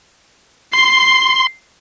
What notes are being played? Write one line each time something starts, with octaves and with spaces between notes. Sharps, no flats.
C6 C7